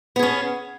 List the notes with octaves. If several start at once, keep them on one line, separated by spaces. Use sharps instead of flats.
B3 C#4 G#4